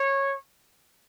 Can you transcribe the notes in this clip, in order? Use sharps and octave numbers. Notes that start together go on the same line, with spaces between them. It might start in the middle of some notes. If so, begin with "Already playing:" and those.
Already playing: C#5